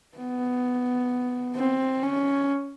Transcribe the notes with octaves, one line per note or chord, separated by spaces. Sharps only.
B3
C4
C#4